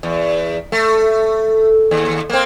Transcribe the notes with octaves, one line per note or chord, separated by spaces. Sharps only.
E2
A3
D#2
A#3 C4